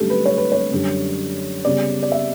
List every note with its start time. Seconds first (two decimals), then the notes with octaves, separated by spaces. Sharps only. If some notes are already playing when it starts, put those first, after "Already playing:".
Already playing: G2 D3 F#3 A3 C#4 G4 A4
0.10 B4
0.26 C#5
0.38 B4
0.52 C#5
0.71 F#2 D3 G3
1.65 C#3 G3 B3 D5
2.03 D5
2.12 E5